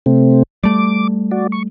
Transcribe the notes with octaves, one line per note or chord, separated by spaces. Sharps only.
C3 A3 C4
G3 A3 D6
F#4 D5
C#6